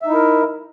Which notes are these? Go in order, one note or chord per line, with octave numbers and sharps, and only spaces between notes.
D#4 E4 A#4 E5